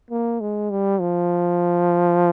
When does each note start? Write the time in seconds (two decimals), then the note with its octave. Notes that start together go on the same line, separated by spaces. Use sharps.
0.11 A#3
0.41 G#3
0.71 G3
1.00 F3